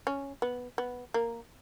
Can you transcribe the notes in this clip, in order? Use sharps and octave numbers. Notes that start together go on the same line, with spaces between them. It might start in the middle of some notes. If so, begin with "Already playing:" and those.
C#4
B3
B3
A#3